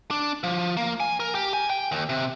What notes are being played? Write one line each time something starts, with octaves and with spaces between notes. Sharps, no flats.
D4
F3
A#3
G#5
A#4
G4
G#5
G5
D#2
C3